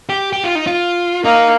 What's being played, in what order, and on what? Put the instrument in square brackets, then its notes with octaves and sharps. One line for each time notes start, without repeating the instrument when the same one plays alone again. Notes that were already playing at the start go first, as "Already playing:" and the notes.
[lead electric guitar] G4
G4
F4
D#4
F4
[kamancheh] A#3 [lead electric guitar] D#4